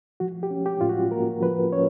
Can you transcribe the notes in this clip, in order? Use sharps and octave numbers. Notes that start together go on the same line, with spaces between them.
F3 F#4
G4
C#4
G4
A2 F4
F#4
A#3 A#4
F3 B4
C#4 C#5